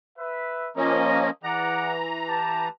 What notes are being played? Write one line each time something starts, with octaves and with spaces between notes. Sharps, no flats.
B4 E5
F3 A#3 C#4 D#5 A#5
E3 G#4 D5 F#5 A#5
G4 B4 A5